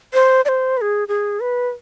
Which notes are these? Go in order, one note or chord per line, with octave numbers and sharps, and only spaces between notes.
C5
D5
C5
B4
G#4
G#4
B4